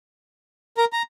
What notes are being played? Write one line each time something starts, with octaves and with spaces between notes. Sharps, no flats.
A#4 A#5
A#5